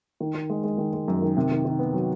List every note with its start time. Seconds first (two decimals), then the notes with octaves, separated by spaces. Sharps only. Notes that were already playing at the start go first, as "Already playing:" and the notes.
0.20 D#3
0.35 D#3
0.50 G#3
0.64 G#3
0.78 D#3
0.93 G#3
1.08 F#2
1.22 D#3
1.37 C3
1.51 D#3
1.65 D#3
1.79 B3
1.94 F#3